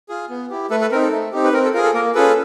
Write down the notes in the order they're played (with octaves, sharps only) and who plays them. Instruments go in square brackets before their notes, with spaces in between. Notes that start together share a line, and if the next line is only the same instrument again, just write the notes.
[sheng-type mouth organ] F4 G#4
B3
E4 G4
A3 A4 B4
A4 B4
C4 D#4 A#4
A4
A3
C4 D#4 G4
B4
C4 A#4
A4
F4 G#4 A#4
A4
A#3 A#4
C#4 F4 G#4 A4 B4